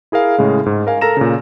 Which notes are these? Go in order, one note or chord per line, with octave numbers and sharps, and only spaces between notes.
E4 G#4 A#4 F5
A2 C#3 G#3
G#2
A#4 F5 G#5
A4 A#4 A#5 A#6 E7
A#2 C#3